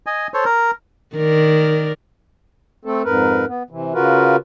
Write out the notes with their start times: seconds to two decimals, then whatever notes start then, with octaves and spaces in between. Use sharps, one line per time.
0.06 D#5 G#5
0.34 A4 C5 C#5
0.45 A#4
1.16 D#3 A#4 D5
2.85 A3 C4 A4
3.04 F2 G#2 A#4 B4
3.48 B3
3.70 C3 E3
3.94 C#3 F4 F#4 A#4 B4